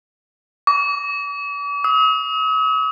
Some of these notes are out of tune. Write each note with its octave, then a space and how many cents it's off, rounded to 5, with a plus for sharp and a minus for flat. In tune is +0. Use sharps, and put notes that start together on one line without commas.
D6 -45
D#6 +45